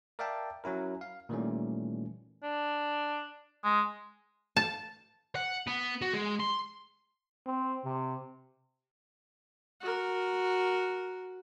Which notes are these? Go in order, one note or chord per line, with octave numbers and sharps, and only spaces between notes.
A#4 D5 E5 F5 G5 A5
F#3 C#4 E4 A#4
F5
A#2 D#3 E3 G3 A3 C#4
D4
G#3
A5
F#5
B3
F#4
G#3
C6
C4
C3
F#4 A#4